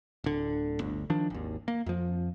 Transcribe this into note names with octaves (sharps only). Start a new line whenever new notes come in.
D1 D3
G1 D2
D#3 F3 D4
G#1 D#2
A#3
F2 F3